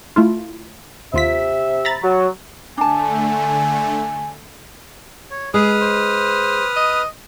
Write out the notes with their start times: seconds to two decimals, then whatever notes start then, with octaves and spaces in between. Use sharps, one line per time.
0.16 A3 E4 F4
1.14 D#2 C3 F4 E5 B6
1.85 A#5 B5 A6
2.03 F#3
2.77 D3 A3 D4 G#5 A5
5.31 C#5
5.54 G#3 G#4 B4 D#6 F6
5.82 C5
6.76 D#5